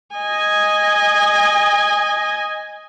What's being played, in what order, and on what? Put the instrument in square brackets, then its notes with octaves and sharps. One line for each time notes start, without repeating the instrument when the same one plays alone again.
[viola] D#5 G#5